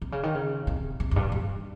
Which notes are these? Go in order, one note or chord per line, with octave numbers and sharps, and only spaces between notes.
C3
C#3
D#3
C#3
C3
C3
F2
G2
G2